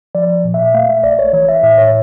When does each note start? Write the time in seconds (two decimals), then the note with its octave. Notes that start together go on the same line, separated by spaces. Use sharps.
0.15 F3 D5
0.45 A#2
0.54 E5
0.74 A3 F5
0.89 E5
1.04 A#1 D5
1.19 C#5
1.33 E3 C#5
1.49 E5
1.63 A2 E5
1.78 C#5